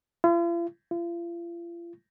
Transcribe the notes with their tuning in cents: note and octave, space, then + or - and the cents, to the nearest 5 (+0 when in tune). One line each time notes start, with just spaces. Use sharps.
F4 -45
F4 -40